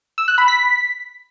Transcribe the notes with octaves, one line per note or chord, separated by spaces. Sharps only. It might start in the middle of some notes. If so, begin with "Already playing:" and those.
E6
F#6
B5
B6